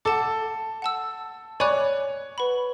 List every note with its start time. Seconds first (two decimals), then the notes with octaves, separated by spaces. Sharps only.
0.05 A4 F#5 A5 D6
0.82 F#5 A5 E6
1.60 C#5 D5 G#5 B5 D6 F#6
2.38 B4 F#5 B5